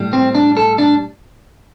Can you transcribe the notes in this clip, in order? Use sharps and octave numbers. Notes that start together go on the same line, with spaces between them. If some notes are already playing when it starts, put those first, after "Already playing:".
Already playing: A2 G3
C4
D4
A4
D4